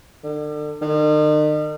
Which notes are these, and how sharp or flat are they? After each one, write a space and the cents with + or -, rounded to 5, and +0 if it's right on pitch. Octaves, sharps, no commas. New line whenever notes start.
D3 +35
D#3 -40